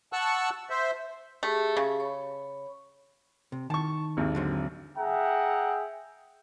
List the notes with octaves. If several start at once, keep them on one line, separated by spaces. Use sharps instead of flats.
F#5 A5 C#6 E6 F#6
C5 E5
A3 G4 G#4
C#3
C#5 B5 C#6
C3
D#3 A5 C#6
G#1 D#2
D3 F#3 C4
G#4 E5 F#5 G5 A#5